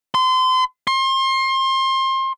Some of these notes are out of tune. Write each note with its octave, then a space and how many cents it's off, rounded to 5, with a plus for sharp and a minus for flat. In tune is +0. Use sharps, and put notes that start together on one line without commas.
C6 -30
C6 +30